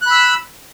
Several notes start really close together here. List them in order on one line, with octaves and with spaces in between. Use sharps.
F#6 B5 E6